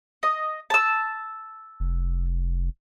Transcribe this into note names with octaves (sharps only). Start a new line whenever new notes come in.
D#5
A5 E6
F1